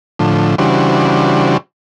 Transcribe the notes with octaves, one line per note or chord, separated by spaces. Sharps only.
A2 D3 F3
C#3 E3 G3 D4 F#4 C5